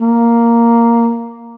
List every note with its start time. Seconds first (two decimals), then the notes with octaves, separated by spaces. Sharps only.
0.01 A#3